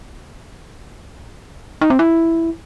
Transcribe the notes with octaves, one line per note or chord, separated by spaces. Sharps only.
D#4
C4
E4